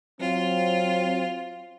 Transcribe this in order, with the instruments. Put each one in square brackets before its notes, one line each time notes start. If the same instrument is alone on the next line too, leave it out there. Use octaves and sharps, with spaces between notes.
[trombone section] F#3 C4 [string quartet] F4